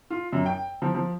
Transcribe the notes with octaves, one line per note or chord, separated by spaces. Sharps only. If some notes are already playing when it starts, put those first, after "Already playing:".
F4
F#2
G5
F3
F3